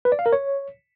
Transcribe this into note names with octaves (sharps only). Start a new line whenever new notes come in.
B4
D5
F5
A#4
C#5